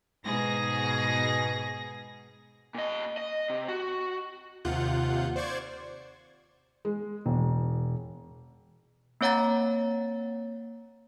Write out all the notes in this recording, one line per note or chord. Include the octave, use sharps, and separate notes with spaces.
G#2 B2 G#4 A#6
A#2 D#5
D#5
C3
F#4
D#2 C3 F4 F#5 G6
C5 D5 C#6 G#6
G#3
E1
A#3 C4 C#5 F#5 A#5 A6